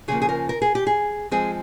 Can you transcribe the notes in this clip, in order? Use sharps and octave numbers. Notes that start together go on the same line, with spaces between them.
C#3 F3 A#3 G#4
G#4
A#4
A#4
G#4
G4
G#4
F3 G#3 C4 G#4